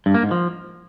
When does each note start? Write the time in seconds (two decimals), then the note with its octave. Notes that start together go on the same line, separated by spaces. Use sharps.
0.06 G2
0.14 A#3
0.23 G#2
0.31 F3